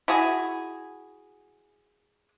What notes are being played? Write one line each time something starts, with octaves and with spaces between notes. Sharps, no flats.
E4 F#4 G#4